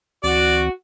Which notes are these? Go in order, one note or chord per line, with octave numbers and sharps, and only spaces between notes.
D2 E3 C4 F#4 D5